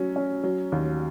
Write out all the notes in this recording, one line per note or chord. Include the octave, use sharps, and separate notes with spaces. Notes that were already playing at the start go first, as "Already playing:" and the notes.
Already playing: F#3 C#4
C#4
F#3
D#2